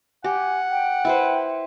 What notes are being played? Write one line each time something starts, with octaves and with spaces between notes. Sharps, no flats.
G4 F#5 G#5
G5
E4 B4 C5